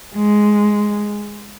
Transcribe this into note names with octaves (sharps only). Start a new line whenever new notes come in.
G#3